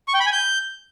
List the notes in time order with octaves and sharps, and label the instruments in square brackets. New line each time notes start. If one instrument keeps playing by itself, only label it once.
[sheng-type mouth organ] C#6
G5
B5
G#5
G6